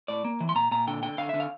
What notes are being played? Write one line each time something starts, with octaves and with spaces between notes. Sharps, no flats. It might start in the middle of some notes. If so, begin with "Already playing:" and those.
A2 D5
A#3
E3
C6
A#2 A#5
A#2 A#5
D3 G5
D3 G5
D3 F5
E5
D3
F5